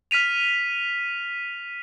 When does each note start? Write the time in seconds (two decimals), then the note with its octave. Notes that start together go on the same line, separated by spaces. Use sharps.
0.11 F6 B6 D#7 F7